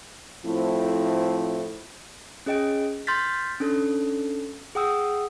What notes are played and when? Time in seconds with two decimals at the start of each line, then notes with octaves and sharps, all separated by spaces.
0.44 A2 F3 A3 C4 E4
2.46 C#4 G#4 D#5 G5 D7
3.07 C6 F6 G6 A6 B6
3.60 C#4 D4 A4
4.75 G#4 F#5 G5 D#6 E6